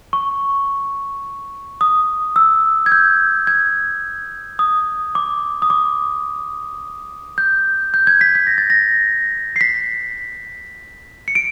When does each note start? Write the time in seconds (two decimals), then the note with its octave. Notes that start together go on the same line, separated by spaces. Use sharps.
0.13 C#6
1.81 D#6
2.36 E6
2.86 G#6
2.92 G6
3.47 G#6
4.59 D#6
5.15 D6
5.62 D#6
5.70 D6
7.38 G6
7.94 G6
8.07 G#6
8.21 B6
8.35 B6
8.47 A#6
8.58 A6
8.70 A#6
9.56 C7
9.61 B6
11.28 C#7
11.35 D7